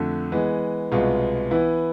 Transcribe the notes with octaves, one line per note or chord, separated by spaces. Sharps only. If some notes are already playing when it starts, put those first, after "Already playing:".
Already playing: F2 D3 A3
E3 G#3 B3
C2 B2 G#3 B3 F4
E3 B3 E4